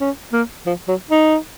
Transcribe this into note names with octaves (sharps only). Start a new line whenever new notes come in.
C#4
A#3
F3
F#3
D#4